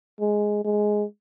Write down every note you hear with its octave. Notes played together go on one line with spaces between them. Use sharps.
G#3
G#3